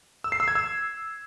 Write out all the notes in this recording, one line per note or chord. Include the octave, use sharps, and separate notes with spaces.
E6
C7
E6
G#6
E6